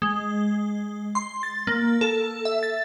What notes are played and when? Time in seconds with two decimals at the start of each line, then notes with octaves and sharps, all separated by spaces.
0.02 G#3
1.15 C6
1.43 A6
1.67 A#3
2.01 A4
2.45 E5
2.63 A6